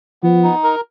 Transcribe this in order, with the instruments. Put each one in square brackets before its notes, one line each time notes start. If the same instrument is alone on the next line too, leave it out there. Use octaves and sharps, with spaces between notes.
[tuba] F3 [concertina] B3
[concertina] D#4
A#4